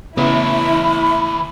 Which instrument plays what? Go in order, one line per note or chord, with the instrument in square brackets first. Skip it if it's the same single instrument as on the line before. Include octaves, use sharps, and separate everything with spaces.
[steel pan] C#3 B3 [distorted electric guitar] E3 C#5 [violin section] E4 [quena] B5